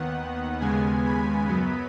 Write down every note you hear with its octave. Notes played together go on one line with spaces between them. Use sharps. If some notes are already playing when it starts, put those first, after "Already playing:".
Already playing: D#2 D#3 B3 F#5
D#2 C#3 G#3 B3 G#5
B5
F#2 F#3 B3